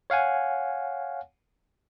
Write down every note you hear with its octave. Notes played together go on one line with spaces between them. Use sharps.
C#5 F5 F#5 G#5